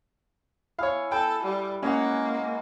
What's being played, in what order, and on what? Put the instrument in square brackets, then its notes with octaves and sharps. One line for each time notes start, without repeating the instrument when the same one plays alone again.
[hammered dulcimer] E4 G#4 [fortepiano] C#5 F5
[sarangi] A4 [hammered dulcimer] B4 [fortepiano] G5
[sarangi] G3
[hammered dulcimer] G#3 C#5 F#5 [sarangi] A#3 [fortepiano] C#4